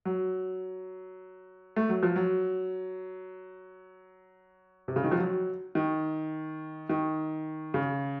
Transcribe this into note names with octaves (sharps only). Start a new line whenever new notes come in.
F#3
A3
F#3
F3
F#3
C3
C#3
D#3
F3
F#3
D#3
D#3
C#3